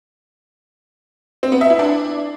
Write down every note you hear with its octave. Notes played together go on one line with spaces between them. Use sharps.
C4
B3
E5
E4
D4